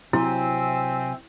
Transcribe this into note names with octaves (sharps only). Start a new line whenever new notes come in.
C3 F#3 C4 E4 E5 G#5 E6